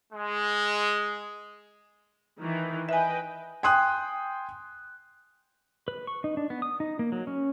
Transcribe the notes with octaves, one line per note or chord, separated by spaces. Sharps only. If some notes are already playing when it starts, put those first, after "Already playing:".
G#3
D#3 E3
B4 D#5 E5 G5 G#5
G5 G#5 C6 D#6 F#6
B4
C#6
D#4
D4
B3
D#6
D#4
A#3
F#3
C#4